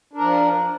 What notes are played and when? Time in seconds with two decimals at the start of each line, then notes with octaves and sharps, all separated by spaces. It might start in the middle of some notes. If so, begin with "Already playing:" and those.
0.13 D4
0.17 A#4
0.21 F3